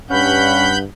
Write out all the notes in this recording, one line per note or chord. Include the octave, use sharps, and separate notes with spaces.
G2 C#4 F#5 B5 G6